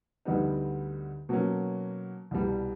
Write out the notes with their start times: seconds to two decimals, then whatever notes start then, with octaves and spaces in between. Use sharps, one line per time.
0.25 D2 D3 G3 B3 D#4
1.29 B2 F#3 A#3 C#4
2.31 C2 B2 G3